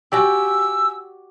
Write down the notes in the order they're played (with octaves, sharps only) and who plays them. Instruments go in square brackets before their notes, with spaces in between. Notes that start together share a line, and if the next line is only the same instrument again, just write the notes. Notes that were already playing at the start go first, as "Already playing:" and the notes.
[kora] F#4 G4 D5 [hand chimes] G5 G#5 [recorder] E6